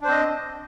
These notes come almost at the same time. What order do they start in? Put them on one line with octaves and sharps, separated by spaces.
D4 C5 C4 D#5